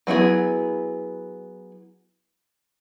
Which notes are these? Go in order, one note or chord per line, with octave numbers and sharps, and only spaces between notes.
F#3 B3 E4 G#4